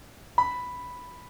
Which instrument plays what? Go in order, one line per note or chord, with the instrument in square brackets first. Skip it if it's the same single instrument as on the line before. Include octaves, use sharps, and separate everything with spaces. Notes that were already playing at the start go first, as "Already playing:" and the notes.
[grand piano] B5